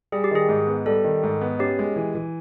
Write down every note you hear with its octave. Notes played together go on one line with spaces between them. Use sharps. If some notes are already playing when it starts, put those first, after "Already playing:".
G3 G#4
G4
D#3 G#4
G#2
B3
G3 A4
D#3
G#2
B3
C#4 G4
G#3
E3
E3